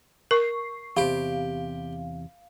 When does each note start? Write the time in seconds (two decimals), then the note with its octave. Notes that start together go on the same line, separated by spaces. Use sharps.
0.31 A#4 C#6 C7
0.97 E2 C3 G4 F5